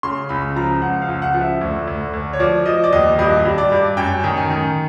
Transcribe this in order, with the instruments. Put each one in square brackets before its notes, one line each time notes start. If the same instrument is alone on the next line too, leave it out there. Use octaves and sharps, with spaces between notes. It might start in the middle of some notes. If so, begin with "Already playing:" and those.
[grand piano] C#3 C6
C#2 B5
F3 A#5
C#2 F#5
F5
C#2
F#5
F3
E5
D2
D2
D2
C#5
F3 D5
F3 D#5
D5
D#2 D#5
G2 D#5
G2
D5
G2
F#2 G5
D#3
G#5
D#3